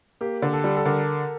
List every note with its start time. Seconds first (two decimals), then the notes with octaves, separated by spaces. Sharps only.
0.21 A#3 G4
0.42 D3
0.53 A4
0.64 G3
0.77 A4
0.85 D3 A#4